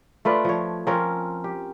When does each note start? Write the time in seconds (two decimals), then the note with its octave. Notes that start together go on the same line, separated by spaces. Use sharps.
0.25 A3 F4 B4 D5
0.44 F3 C#5
0.87 F3 C4 C#4 A#4
1.44 G4